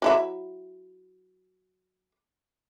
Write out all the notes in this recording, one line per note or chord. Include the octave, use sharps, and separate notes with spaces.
F#3 E4 E5